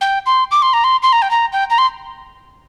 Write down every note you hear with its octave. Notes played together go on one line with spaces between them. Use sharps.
G5
C6
D6
C6
A#5
C6
C6
A#5
G5
A#5
G5
A#5
C6